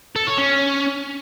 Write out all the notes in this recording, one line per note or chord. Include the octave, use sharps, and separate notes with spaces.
A4
C#5
C#4